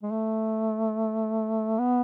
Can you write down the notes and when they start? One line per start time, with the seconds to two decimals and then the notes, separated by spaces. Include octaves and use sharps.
0.03 G#3
0.11 A3
1.79 B3